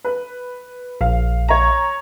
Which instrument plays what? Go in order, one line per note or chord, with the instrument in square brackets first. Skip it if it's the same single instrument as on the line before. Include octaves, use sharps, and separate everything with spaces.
[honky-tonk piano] B4
[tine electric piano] A#1 [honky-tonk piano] F5
[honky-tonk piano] C#5 A#5